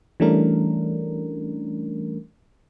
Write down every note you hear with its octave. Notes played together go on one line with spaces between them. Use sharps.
E3 G3 A3 C#4 D4 A#4